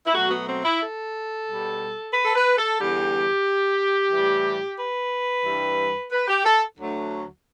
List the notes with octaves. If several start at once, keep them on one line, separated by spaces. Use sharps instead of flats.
E4
B2 F#3 A3 F#4
B3
C4
E4
A4
B2 G3
B4
A4
B4
A4
E2 D3 G3 G4
A2 E3 G3
B4
G2 E3 G3
B4
G4
A4
D2 D3 F#3 A3